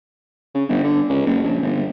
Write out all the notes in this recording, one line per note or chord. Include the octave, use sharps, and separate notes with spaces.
C#3
G1
D3
C#2
F#1
A#1
G1